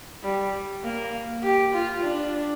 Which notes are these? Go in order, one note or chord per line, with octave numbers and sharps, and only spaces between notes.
G3
A#3
G4
F4
D4